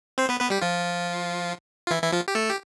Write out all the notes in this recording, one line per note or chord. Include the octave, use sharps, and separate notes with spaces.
C4 C5
B3 B4
B3 B4
G3 G4
F3 F4
F4
E3 E4
E3 E4
F3 F4
G4
A3 A4
G4